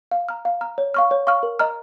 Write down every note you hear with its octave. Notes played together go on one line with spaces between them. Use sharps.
F5
A#5 F6
F5
A#5 F6
C#5
F5 C#6 F6
C#5
F5 C#6 F6
A#4
D#5 A#5 F6